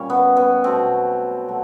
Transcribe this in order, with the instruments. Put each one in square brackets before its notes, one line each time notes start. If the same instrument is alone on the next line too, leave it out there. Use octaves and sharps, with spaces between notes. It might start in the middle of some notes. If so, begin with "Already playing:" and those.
Already playing: [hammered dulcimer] A#2 G3 C#4
B3
B3
B2 F#3 A3 C4
B2 F#3 A3